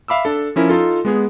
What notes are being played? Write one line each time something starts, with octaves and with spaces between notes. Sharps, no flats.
E5 F5 B5 D6 E6
D4 A4
F3 C#4 E4 A#4
D#4 F4 A4
G#3 B3 G#4